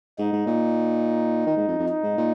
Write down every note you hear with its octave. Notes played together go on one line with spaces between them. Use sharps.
G#2 D#4
G#2
A#2
D#3
G#2
F2
F2
D#4
G#2
A#2